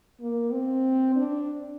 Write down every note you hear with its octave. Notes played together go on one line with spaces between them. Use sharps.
A#3
C4
D4